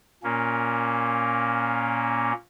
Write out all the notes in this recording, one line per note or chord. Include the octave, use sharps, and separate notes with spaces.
A#2 A#3 C#4